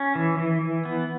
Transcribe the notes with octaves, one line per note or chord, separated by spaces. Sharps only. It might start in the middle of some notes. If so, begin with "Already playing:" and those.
Already playing: C#4
E3
E3
E3
B3